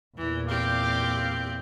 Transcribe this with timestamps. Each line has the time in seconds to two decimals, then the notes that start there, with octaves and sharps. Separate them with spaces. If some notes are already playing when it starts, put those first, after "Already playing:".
0.17 E2 A#2 E3
0.48 C4 G4 F5 D6